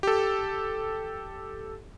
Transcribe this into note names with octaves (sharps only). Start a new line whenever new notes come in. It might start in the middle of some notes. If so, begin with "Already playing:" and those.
G4 A4